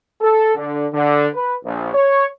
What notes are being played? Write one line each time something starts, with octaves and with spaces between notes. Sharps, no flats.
A4
D3
D3
B4
A#1
C#5